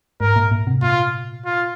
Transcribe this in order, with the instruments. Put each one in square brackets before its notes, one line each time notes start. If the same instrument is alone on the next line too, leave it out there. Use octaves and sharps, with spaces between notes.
[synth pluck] G#2 [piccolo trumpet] A#4
[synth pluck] A#2
A#2
C3
[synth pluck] A#2 [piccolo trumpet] F4
[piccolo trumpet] F4